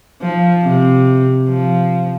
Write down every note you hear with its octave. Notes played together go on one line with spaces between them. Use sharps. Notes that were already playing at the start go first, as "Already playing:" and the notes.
F3
C3
F3